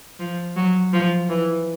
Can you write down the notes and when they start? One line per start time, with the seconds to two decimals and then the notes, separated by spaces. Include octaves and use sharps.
0.20 F3
0.56 F#3
0.93 F3
1.29 E3